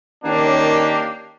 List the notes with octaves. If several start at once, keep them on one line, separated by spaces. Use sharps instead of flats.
D#3 A#3 C#4 D4 G4